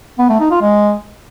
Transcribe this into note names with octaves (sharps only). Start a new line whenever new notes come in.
B3
A3
D#4
F4
G#3